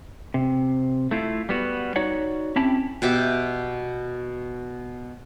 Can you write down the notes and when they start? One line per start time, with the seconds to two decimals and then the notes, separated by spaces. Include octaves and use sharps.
0.34 C3
1.11 A3 E4 F4
1.49 G3 B3 F#4
1.96 D#4 F#4 C#5 D5 F#5
2.56 C4 C#4 E4 G4 A5 B5
3.02 B2 G4 E5 D6